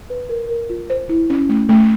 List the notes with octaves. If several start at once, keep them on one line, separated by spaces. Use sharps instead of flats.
B4
A#4
A#4
F4
C5
E4
C#4
A3
A3